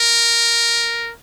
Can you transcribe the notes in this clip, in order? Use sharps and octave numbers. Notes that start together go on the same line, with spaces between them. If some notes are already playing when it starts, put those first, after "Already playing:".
Already playing: A#4